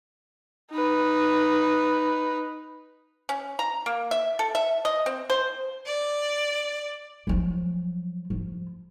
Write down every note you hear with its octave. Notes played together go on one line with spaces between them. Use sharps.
D#4 B4
C#4
A#5
A#3
E5
A4
E5
D#5
C4
C5
D5
F3 F#3
F3